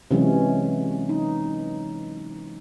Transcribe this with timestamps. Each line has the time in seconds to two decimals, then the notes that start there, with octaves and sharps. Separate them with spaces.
0.11 C3 E3 F#3 G#3 C#4
1.09 D#4